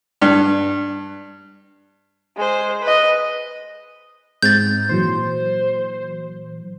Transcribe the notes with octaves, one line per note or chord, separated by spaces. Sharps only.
G2
G#3 C5
B4 D#5
G#2 G#3 C4 G6 A6
A#2 E3 F#3 C5